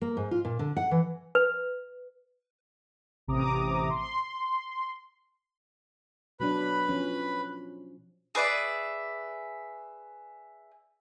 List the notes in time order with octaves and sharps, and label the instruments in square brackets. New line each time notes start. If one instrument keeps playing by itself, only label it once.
[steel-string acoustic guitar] A#3
G#2
F4
A#2
D3
F#5
E3
[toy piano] B4
[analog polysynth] A1 C3 A#5 D6 D#6
C6
[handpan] B2 F#3 D4 [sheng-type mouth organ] B4 B5
[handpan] F3 C#4
[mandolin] G#4 B4 D5 E5